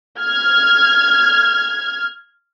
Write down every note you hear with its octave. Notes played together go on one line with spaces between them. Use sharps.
F6 G#6